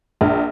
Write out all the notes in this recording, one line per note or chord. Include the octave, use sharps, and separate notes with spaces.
A#1